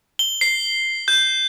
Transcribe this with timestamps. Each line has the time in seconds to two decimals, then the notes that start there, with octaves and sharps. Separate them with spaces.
0.19 G7
0.41 C7
1.08 G6